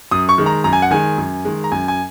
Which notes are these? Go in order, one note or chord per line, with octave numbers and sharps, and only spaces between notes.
F#2 D#6
C#6
D#3 G#3
A#5
F#2 A#5
G#5
F#5
D#3 G#3 G#5
F#2
D#3 G#3
A#5
F#2 G#5
G#5